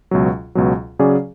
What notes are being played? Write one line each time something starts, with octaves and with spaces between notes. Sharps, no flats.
C#2 B2 F#3
C#2 B2 F#3
C#3 F#3 C#4 G#4 D5